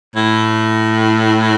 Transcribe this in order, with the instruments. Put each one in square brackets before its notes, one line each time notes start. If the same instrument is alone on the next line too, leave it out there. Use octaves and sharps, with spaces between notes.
[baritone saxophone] A2